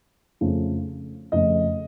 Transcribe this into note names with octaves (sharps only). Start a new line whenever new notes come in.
F2 C#3 F3 A3
F2 C#3 F3 A3 D#5